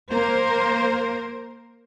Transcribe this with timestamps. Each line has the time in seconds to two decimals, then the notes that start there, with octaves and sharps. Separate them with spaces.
0.11 A#3 A#4 C5